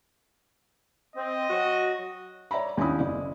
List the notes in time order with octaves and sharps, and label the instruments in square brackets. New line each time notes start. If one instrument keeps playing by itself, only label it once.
[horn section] C4 [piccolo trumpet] D#5
[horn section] F#3 F#4
[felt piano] C#5 D5 E5 A#5 B5
D#2 C#4 D4 E4 B5 D#6
F#1 D5